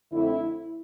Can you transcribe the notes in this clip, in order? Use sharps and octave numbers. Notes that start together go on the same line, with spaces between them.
F2 D3 A3 C4 E4